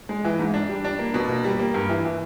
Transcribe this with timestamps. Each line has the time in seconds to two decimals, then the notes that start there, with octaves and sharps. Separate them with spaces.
0.09 G#3
0.25 E3
0.39 G#2
0.54 D4
0.69 G3
0.85 D4
0.99 A#3
1.14 B2
1.29 A#3
1.44 G3
1.59 A#3
1.74 G2
1.89 E3
2.05 E3